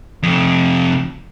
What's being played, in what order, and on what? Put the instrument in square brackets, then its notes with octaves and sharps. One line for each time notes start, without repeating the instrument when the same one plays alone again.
[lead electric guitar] F2 C3